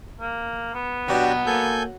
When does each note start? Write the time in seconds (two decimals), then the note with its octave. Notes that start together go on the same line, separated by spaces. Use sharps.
0.21 A#3
0.74 B3
1.08 B2 F#3 D4 F#4 G4
1.46 A#3 A4 G#5 G6